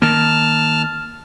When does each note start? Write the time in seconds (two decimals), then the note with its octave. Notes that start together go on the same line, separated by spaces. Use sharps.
0.02 D#3 A#3 A5 F6